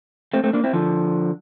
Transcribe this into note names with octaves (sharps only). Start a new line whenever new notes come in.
A3 C4
A3 C4
A#3 D4
C4 E4
D3 F3